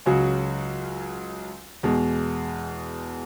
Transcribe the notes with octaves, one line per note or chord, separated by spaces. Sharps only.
C#2 C#3 F#3 C#4 F#4
E2 B2 G#3